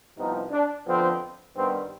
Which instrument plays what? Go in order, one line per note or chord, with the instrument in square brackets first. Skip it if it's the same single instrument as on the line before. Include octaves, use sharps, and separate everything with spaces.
[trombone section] C2 C3 F3 B3 D#4
D4
F2 D3 F3 B3 C4
G2 D#3 G3 B3 C4